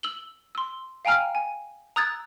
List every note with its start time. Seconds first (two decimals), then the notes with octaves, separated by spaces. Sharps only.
0.03 E6 F#7 G7
0.55 C6 E6
1.05 F5 G5 G#5 A#5 F6
1.35 G#5
1.96 A#5 D#6 E6 F#6 G#6 A6